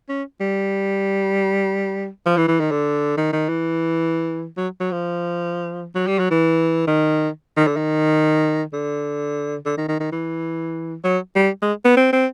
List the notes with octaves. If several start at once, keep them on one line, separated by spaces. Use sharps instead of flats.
C#4
G3
F3
E3
E3
D#3
D3
D#3
D#3
E3
F#3
F#3
F3
F#3
G3
F#3
E3
D#3
D#3
D3
D#3
D3
D3
D#3
D#3
D#3
E3
F#3
G3
G#3
B3
C4
C4